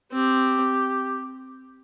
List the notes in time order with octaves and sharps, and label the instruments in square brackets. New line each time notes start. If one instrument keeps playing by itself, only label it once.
[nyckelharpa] C4 [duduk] G4